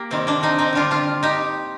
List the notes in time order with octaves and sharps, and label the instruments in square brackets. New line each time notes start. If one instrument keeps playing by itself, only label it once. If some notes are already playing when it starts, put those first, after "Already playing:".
Already playing: [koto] A#3 G4
C3 D#3 G3 C4
A#3 D4
C4 D#4
C4 D#4
D3 G3 D4 F4
D4 F4
D#4 G4